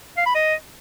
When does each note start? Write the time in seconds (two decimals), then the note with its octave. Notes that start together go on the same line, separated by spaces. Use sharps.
0.17 F5
0.26 B5
0.35 D#5